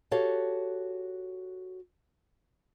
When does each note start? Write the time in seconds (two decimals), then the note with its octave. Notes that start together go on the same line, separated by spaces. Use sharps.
0.11 F#4 G4 A4 C#5 F5